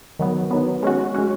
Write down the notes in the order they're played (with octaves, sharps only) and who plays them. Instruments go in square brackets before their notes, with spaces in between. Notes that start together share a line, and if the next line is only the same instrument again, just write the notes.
[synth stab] D#3 F#3 B3
D#3 F#3 B3
G#3 C#4 F#4
G#3 C#4 F#4